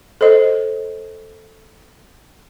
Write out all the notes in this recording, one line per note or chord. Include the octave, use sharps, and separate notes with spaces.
A4 C5 D#5